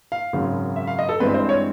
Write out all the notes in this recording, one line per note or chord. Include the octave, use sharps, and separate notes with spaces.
F5
G#1 F#2 C#3 F#3
E5
F5
D#5
A4
G2 E3 G#3 C4 B4
C5
C#5